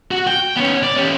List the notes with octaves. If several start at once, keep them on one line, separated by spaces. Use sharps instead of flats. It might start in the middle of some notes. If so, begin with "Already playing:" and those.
F#4
G5
B3 C#4
D5
C#4 G4